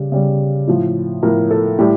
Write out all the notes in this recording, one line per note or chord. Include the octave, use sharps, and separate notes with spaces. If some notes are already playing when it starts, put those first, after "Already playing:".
Already playing: C#3 G3
C#3 G3
A2 F3
A2 F3 A#4
A4
A2 G3 G4